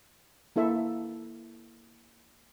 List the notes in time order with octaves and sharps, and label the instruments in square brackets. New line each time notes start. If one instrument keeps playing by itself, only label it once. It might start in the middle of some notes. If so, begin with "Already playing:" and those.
[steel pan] A#3 E4 A4 E5